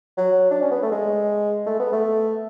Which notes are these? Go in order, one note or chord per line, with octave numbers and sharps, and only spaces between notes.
F#3
D4
C#4
B3
A3
G#3
A3
B3
A3